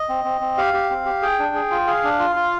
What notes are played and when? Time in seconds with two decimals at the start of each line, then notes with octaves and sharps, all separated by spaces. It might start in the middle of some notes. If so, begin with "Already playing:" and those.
Already playing: D#5
0.09 C4
0.25 C4
0.41 C4
0.58 G4 F5
0.74 G4
0.90 C4
1.05 G4
1.22 G#4 G5
1.39 D4
1.55 G#4
1.71 F4
1.87 G#4 F5
2.04 D4
2.19 F4
2.36 F4